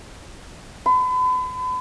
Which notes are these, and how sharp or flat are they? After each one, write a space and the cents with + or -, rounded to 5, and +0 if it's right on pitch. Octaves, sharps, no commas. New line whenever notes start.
B5 +40